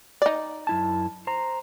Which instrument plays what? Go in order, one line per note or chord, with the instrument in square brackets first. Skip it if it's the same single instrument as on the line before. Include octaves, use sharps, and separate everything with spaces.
[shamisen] D#4 D5
[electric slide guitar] F#2 E4 A5
C5 A#5